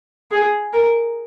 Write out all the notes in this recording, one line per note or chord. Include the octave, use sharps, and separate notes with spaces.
G#4
A#4